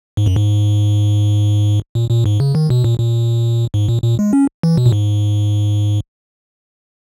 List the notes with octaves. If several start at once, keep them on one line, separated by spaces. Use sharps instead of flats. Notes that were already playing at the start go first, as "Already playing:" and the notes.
G#2
F#2
G#2
A#2
A#2
G#2
C#3
D#3
B2
A#2
A#2
G#2
A#2
A#2
G#3
C#4
E3
B2
A#2
G#2